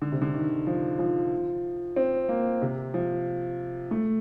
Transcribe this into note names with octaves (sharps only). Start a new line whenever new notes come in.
D3
C3
D3
D#3
F3
F3
C4
A#3
C3
F3
A3